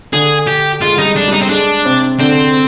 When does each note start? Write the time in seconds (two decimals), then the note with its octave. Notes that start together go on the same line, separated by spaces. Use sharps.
0.13 D3 D4 G#4
0.48 G4
0.82 G#3 F4
0.98 G3 D#4
1.05 G#3
1.16 D4
1.28 G3
1.33 D#4
1.42 C4
1.51 G#3 D4
1.85 C3 C4
2.19 D3 C4 D4